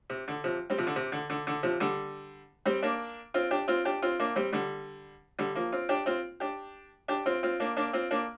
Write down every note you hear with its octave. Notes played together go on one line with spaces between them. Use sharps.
C3
D3
C3 F3
G3 C4
C3 F3
D3
C3
D3
D3
D3
C3 F3
D3 G3
G3 C4
A#3 D4
C4 F4
D4 G4
C4 F4
D4 G4
C4 F4
A#3 D4
G3 C4
D3 G3
D3 G3
F3 A#3
C4 F4
D4 G4
C4 F4
D4 G4
D4 G4
C4 F4
C4 F4
A#3 D4
A#3 D4
C4 F4
A#3 D4